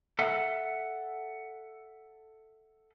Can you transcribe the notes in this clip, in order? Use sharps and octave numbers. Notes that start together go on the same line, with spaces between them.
A4 E5 F#5